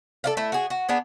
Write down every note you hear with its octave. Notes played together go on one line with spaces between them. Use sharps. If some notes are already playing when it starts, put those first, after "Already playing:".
A4 D5 F5
A3 E4
F#4 G#4
F#4
B3 D4 G#4